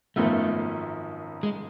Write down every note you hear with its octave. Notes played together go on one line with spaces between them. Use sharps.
G#1 F#2 F3 A3 B3
G#3